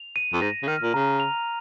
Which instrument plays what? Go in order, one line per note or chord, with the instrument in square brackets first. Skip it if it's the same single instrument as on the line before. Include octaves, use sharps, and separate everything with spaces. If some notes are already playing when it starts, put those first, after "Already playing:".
Already playing: [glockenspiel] F7
D#7
[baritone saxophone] F2
[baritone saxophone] G#2 [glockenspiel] A#6
[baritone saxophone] C#3
[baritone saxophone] D#3 [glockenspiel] F6
[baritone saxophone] A#2
[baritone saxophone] C#3 [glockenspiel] A#5
[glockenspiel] F7